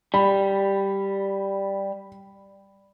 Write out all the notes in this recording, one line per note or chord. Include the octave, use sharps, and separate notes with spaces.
G3 B5